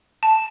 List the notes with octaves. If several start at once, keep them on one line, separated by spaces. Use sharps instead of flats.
A5